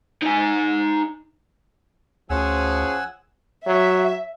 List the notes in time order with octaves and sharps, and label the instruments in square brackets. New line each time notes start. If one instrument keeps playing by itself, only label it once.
[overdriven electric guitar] D#4 G#5
[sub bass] D2 [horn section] F3 C#4 G#4 [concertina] F#5 G#5 E6
[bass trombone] F#3 [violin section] E5